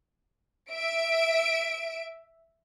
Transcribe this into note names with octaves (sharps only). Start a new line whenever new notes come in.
E5 D7